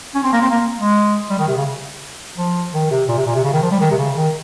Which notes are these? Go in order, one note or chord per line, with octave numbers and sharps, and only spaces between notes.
C#4
C4
A#3
C4
A#3
G#3
G3
D#3
C3
C#3
F3
D#3
C3
A#2
C3
A#2
C3
C#3
D#3
F3
G3
D#3
C3
C#3
D#3